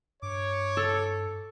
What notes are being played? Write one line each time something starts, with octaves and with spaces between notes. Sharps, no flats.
G2 C#5 D6
A4